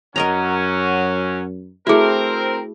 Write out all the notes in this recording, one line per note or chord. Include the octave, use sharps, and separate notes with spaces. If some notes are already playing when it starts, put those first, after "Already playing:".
F#2 F#3 C#4 A#4 D#5 A#5
A3 C4 E4 F#4 G#4 A#4